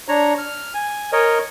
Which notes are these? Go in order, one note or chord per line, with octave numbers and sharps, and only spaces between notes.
D4 C#5 A#5
F6
G#5
A#4 C#5 D#5